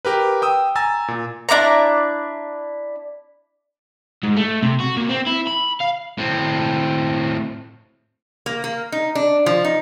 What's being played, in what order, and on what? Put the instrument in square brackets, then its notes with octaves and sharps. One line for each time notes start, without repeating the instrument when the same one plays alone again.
[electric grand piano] G4 A#4 B4
G5 D#6 E6
G#5 A#5 E6 A6
A#2
[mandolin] D4 E4 D5 A#5
[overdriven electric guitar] G#2
A3
C3
F#4
A#2
C4
E4
B5
F5
[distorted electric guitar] A2 C4
[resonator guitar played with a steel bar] A#3
A#3
D#4
D4
F3
D#4